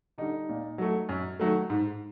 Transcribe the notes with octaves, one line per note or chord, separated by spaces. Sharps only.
D3 G3 D#4
A#2
F#3 A3
F#2
D#3 F#3 A3
G#2